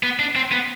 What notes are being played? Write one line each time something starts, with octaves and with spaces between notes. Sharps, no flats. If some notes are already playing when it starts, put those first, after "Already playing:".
B3
D4
C4
B3